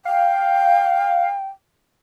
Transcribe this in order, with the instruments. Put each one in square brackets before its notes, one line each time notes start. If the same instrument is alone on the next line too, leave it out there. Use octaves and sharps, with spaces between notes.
[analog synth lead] F5 [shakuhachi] G5